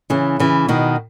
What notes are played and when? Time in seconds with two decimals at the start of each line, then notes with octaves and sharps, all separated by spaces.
0.10 C#3 E3
0.40 C#3 E3
0.68 B2 D#3